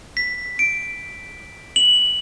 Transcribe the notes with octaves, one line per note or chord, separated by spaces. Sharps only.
B6
D7
F#7